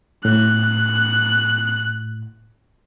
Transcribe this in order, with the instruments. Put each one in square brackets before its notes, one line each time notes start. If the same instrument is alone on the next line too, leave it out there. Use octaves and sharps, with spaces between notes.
[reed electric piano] A2 [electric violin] F#6